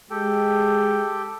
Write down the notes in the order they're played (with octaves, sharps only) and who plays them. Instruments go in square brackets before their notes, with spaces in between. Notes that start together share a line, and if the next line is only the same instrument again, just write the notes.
[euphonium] G#3 [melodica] G4 A4 G5